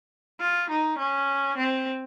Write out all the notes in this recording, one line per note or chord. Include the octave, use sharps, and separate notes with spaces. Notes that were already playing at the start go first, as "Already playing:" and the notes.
F4
D#4
C#4
C4